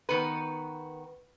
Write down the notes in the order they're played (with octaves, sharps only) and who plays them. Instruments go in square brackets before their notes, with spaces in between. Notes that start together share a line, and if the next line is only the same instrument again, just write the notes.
[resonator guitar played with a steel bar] D#3 B3 F#4 B4